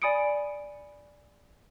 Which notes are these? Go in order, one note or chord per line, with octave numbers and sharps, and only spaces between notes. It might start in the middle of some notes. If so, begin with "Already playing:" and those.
D5 G#5 B5 D#6 C#7 D7